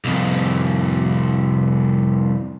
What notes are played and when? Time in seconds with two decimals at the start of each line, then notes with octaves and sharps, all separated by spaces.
0.05 C2 F2